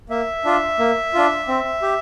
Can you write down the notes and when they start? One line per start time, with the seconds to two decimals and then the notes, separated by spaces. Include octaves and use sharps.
0.09 A#3 E5
0.45 D4 F4
0.79 A#3
1.14 D4 F4
1.48 C4
1.82 G4